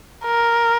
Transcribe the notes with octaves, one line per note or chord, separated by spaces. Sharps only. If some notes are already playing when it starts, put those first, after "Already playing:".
A#4